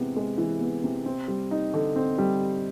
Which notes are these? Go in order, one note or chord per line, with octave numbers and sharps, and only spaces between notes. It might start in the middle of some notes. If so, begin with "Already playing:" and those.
Already playing: C3 E3 G#3 B3
G#3
E3
B3
C3
C4
G3
D#4
D3
C4
G3